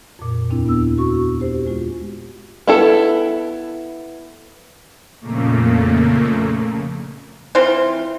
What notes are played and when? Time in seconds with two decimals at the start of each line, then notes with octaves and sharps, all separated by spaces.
0.19 F2 A#2
0.50 D#2 C4 D4 E4
0.65 B3 E6
0.98 F#4 C#6
1.41 G4 C5
1.66 G#3 F4
2.67 B3 E4 A4
5.21 F2 A#2 C#3 A3 A#3
7.55 E3 C4 F4